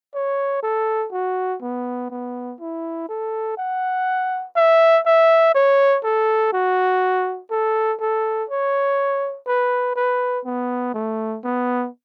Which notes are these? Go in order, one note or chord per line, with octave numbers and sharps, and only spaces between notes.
C#5
A4
F#4
B3
B3
E4
A4
F#5
E5
E5
C#5
A4
F#4
A4
A4
C#5
B4
B4
B3
A3
B3